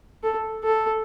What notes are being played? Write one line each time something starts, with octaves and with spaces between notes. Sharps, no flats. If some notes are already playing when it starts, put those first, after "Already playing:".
A4
A4